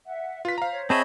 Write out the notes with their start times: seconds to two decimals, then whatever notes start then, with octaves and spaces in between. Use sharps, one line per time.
0.05 E5 F#5
0.45 F4 B4 F5 B6
0.58 C5 F5 A#5
0.71 C5 C#5
0.90 C4 G#4 C5 C#5 D#5 E5 A5 B5